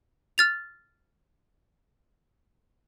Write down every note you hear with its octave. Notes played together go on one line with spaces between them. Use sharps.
F6 A6 F7